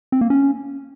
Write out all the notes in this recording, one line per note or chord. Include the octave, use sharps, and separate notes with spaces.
C4
A#3
C#4